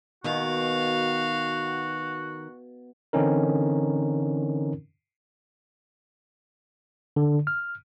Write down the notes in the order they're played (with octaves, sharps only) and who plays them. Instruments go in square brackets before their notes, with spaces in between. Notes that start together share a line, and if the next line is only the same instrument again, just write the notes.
[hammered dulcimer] B2 [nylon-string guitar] D#3 [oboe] F#4 [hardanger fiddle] F5
[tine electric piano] D3 E3 C4 C#4 D#4 A#4
D3
F6